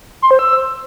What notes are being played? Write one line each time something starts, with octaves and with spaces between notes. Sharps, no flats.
C6
C5
E6